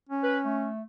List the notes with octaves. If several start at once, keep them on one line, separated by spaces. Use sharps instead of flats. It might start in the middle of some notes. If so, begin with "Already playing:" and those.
C#4
B4
A3